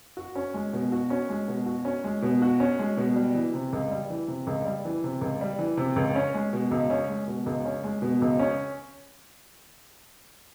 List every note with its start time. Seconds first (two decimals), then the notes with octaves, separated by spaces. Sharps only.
0.17 F#4
0.35 C#4
0.54 G#3
0.73 B2
0.92 F#4
1.10 C#4
1.30 G#3
1.48 B2
1.66 F#4
1.85 C#4
2.04 G#3
2.22 B2
2.42 F#4
2.60 C#4
2.79 G#3
2.97 B2
3.15 G3
3.35 E3
3.54 C3
3.73 C#2
3.91 G3
4.10 E3
4.28 C3
4.47 C#2
4.65 G3
4.85 E3
5.04 C3
5.21 C#2
5.41 G3
5.59 E3
5.77 C3
5.96 C#2
6.15 C#4
6.34 G#3
6.53 B2
6.71 C#2
6.90 C#4
7.09 G#3
7.28 B2
7.46 C#2
7.65 C#4
7.84 G#3
8.02 B2
8.22 C#2
8.39 C#4